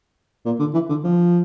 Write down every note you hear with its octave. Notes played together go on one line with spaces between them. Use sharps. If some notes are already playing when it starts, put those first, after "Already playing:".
A#2
D3
E3
D3
F3